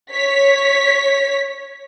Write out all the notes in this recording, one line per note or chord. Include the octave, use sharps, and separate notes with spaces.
C#5 B6